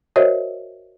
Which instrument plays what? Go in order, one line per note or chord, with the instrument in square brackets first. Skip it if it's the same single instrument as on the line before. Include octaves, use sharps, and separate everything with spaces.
[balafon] F#4 A#4 C5 C#5 D#5 E5